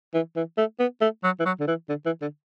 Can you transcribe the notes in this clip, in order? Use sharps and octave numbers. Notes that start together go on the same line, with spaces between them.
E3
E3
A3
B3
A3
F#3
E3
F#3
D3
E3
D3
E3
D3